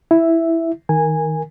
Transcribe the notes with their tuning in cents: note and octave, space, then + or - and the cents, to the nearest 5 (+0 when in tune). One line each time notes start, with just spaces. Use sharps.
E4 +0 E5 +0
D#3 +15 A#4 +0 G#5 -10